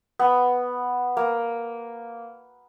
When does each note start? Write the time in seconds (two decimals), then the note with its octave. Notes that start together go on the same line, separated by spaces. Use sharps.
0.19 B3
1.17 A#3